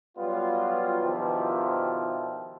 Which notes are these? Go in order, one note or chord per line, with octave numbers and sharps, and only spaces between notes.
F#3 G3 B3 F4
B2 D#3 F3 D4 E4 G4